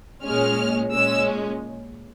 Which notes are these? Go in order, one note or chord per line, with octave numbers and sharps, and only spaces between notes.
A#2 G#3 C#4 F6
A#2 G#3 C#4 E6